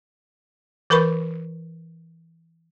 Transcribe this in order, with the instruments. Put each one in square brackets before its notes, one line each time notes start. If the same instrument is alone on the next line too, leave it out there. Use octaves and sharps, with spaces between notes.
[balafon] E3 A#4 B4 B5 C#6